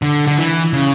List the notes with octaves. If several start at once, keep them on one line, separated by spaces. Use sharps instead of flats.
D3
D3
E3
C#3